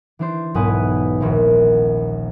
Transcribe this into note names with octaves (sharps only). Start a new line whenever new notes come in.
E3 D4 C5
E1 B1 G#2 B4 G#5 D#6
D#1 A#1 A#2 B3